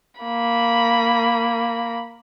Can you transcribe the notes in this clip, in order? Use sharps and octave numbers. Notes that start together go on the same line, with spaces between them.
A#3 B5